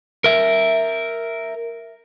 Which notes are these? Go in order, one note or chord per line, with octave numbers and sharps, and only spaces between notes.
A#4 E5